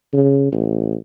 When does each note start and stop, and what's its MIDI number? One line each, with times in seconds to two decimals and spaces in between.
0.13 0.48 49
0.52 0.95 33